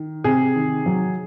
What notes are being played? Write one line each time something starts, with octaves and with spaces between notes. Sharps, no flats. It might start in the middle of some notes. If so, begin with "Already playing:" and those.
Already playing: D#3
C3 G#4
D#3
F#3